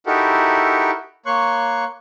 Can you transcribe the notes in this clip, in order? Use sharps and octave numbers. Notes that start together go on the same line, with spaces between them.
D#4 E4 F#4 G4 A4 A#4
A#3 C#5 C6 C#6 F#6